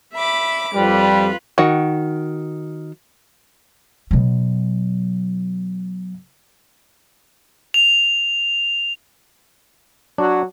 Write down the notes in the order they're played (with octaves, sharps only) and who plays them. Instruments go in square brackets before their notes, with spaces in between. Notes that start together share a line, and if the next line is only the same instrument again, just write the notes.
[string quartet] E5 B5 D6
[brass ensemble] F2 G3 [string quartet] F4 B4
[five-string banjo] D#3 F#4 F#5
[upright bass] B2 F#3
[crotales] F7
[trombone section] F#3 F#4 [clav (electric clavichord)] D4